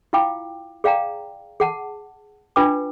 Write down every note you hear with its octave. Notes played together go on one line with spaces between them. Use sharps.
E4 F4 F5 G5 D6
G#4 D5 F5 G5 A#5
G#4 F#5 A5
D4 F4 B4 G5 D6